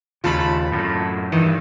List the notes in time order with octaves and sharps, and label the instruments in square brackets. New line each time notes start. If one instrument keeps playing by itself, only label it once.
[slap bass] D#2 C#3 [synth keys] F4 A5 B5
[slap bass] F#2 A2
[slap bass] G2 D#3 [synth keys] E3